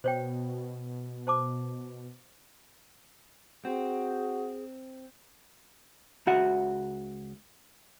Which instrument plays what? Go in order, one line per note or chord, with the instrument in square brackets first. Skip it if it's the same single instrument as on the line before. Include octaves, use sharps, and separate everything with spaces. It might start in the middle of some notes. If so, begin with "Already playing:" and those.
[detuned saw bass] B2 [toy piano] C5 C#5 G5
[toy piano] C5 A5 D6
[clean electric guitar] C4 [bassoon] F#4 [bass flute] G#4
[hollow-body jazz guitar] C#2 C#3 F#4 E5 F#5